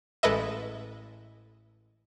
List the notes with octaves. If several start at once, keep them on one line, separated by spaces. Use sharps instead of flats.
A1 G#3 A4 B4 D#5 E5